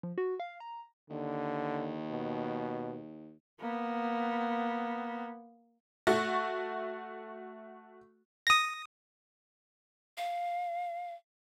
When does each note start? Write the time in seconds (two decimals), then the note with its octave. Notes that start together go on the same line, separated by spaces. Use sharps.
0.03 F3
0.18 F#4
0.40 F5
0.60 A#5
1.10 D#2 D3
2.10 B2
3.60 A#3 B3
6.07 A3 F#4 C#6
8.47 D#6 A#6
10.17 F5